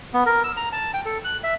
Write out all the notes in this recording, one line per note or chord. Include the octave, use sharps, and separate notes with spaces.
B3
A#4
E6
A#5
A5
G5
A4
F#6
E5